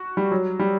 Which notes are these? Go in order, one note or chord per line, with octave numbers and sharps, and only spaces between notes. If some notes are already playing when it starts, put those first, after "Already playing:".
Already playing: F#4
G3
F#3
G3